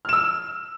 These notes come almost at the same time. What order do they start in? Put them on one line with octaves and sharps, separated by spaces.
F6 E7 E6